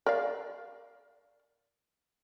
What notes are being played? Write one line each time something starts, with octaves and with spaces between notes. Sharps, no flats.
A#4 D5 F5